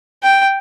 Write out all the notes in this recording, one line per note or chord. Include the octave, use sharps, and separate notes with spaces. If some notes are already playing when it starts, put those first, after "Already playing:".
G5